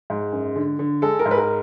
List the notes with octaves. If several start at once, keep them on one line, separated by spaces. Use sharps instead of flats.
G#2
F#2
D3
D3
G#3 A4
A#4
G#2
B4
A#4